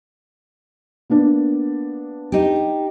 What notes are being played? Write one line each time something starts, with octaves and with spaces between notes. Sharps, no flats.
A#3 B3 D4
D#4 G4